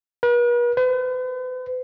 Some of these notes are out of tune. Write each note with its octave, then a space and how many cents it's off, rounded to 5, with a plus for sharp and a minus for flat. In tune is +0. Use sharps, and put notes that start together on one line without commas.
B4 -45
B4 +45